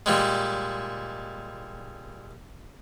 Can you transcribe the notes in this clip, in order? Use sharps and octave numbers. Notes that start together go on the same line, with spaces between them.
A#2 G3 G#3